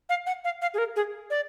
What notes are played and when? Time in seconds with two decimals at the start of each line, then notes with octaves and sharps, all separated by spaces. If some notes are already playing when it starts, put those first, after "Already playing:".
0.09 F5
0.27 F#5
0.45 F5
0.62 F5
0.74 G#4
0.78 A#4
0.96 G#4
1.30 D5